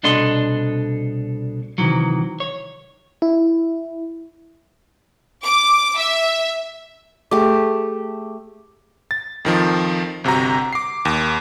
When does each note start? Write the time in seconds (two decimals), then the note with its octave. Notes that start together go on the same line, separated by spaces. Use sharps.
0.03 C2 B2 D4 A4 D#5 C6
1.78 C3 D#3 E3 F#3
2.40 C#5
3.22 E4
5.44 D6
5.97 E5
7.31 A3 G4 G#4 D6
9.11 A6
9.45 F2 D#3 F3
10.24 G1 C3 F#4 A#5
10.73 D6 C7
11.05 D#2